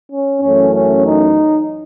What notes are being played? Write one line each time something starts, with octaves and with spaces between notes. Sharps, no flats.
C#4
F#2 E3 A3 C#4
C#4
D#4